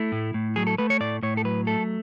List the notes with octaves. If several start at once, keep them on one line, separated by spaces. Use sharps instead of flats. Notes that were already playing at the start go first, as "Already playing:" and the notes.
Already playing: A3 E4
A2
A2
F#3 G#4
A4
A3 B4
C#5
A2 D5
A2 C#5
A4
F#3 B4
A3 A4